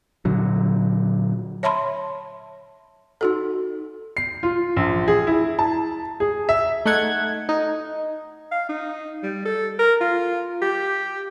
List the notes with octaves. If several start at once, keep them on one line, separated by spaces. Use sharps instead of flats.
A#2 D3 F#3
C#5 E5 A5 B5 C6
D#4 F#4 A4
C7
F4
A#1
G#4
E4
A5
G#4
E5
A3 D#4 F#5 G#6
D#4
F5
D#4
G3
A4
A#4
F4
G4